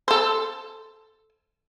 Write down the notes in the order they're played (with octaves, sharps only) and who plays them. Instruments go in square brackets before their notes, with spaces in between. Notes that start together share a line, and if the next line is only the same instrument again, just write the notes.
[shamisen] A4 C5